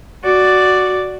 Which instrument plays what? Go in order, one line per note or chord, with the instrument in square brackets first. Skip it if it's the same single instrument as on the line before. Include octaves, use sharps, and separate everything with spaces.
[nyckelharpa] F#4 D5